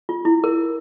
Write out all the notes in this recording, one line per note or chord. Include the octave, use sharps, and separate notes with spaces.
F4
E4
A#4